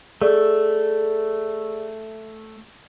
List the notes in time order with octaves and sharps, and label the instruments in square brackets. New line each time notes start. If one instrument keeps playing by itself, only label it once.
[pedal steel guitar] A3 [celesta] G#4 A4 D5